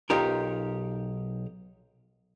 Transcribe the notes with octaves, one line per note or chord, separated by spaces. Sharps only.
B1 D#4 F4 G4 A#4